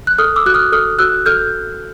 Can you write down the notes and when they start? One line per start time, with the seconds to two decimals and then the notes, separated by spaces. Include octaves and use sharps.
0.07 F#6
0.18 A4 D#6 F6
0.36 D6 E6
0.46 F#4 F#6
0.54 D#6 F6
0.72 A4 D#6 F6
0.99 F#4 E6 F#6
1.26 A4 F6 G6